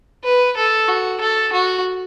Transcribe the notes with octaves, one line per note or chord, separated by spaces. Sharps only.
B4
A4
F#4
A4
F#4